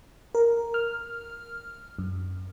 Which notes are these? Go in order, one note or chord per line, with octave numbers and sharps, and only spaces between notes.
A#4
F6
F#2